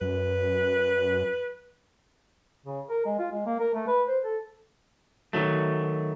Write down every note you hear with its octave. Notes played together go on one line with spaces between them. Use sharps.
F#2 B4
C#3
A#4
G#3
F4
G#3
A#3
A#4
A3
B4
C5
A4
D#3 F#3 A3